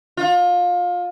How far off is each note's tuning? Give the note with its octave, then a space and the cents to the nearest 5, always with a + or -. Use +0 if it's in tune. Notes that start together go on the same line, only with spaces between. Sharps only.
F4 +25